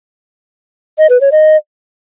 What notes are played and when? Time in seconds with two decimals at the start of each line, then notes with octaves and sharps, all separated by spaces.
0.98 D#5
1.09 B4
1.21 C#5
1.32 D#5